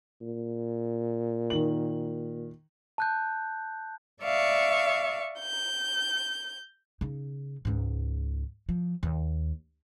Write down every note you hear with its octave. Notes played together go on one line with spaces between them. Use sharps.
A#2
D#3 F#7
A5 F#6 G6
D5 E5 F5 C#6
G6
C#3 D#4
C#2 G#2
F3
D#2